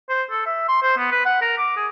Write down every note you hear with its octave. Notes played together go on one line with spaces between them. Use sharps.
C5
A4
E5
C6
C5
B3
B4
F#5
A#4
D6
G#4